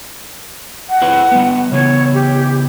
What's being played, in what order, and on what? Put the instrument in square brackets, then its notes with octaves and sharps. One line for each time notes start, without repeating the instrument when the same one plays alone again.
[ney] F#5
[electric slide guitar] C4 E4 B4
G3 B3
[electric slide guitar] C#3 E3 B3 [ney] C#5
[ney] G4